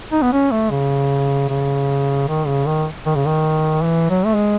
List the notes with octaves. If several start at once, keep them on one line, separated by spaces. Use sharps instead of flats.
D#4
B3
C#4
A3
C#3
C#3
D#3
C#3
D#3
D#3
C#3
D#3
E3
F#3
A3
G#3